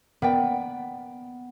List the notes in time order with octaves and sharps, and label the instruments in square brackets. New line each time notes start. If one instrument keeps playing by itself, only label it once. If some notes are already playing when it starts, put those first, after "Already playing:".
[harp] B3 [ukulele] A#4 D5 G5